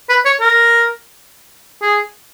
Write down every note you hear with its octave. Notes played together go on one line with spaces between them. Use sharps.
B4
C#5
A#4
G#4